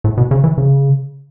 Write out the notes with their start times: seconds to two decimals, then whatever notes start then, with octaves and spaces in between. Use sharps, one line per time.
0.04 A2
0.17 B2
0.31 C#3
0.44 E3
0.58 C#3